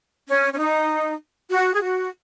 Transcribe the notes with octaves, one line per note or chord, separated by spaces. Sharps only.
C#4
C#4
D#4
F#4
G#4
F#4